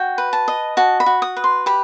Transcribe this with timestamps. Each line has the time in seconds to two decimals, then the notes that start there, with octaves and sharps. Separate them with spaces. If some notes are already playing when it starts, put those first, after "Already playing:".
Already playing: F#4 G5
0.18 B4
0.33 A5
0.48 D#5
0.77 F#4 A5
1.00 B5
1.06 F#4
1.22 D#6
1.37 B4
1.44 C6
1.66 G4 B5